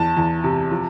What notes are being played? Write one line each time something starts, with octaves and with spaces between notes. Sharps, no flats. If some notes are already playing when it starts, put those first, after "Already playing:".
Already playing: E2 A5
E2
C3
F3